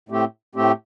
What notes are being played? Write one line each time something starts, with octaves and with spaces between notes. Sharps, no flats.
A2 A3 C4 G4
A2 A3 C4 G4